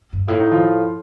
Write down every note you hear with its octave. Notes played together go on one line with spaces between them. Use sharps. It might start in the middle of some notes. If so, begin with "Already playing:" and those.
G2
A2 F4
D#4
F3 F4